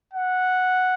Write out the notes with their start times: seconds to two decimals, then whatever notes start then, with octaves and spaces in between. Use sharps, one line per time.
0.13 F#5